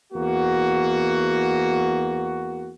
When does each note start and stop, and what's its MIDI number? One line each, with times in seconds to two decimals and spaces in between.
0.13 2.71 40
0.13 2.71 58
0.13 2.71 66